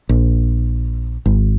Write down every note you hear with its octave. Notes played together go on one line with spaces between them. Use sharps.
A#1
G#1